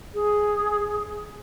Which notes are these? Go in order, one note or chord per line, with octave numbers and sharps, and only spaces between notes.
G#4